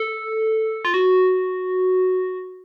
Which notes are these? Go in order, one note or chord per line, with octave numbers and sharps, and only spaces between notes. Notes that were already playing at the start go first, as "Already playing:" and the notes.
Already playing: A4
F4
F#4